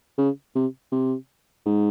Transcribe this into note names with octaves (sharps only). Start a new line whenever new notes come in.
C#3
C3
C3
G#2